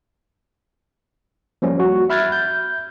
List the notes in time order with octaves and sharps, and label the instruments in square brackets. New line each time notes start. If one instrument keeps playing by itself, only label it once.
[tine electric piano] F3 G3 A#3 C#4
F#4
E5 B5 F6 F#6 G#6 A6
G6